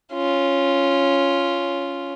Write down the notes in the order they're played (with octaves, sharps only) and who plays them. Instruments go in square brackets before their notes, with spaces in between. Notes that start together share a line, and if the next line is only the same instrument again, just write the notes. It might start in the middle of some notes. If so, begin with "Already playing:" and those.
[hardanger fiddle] C#4 F4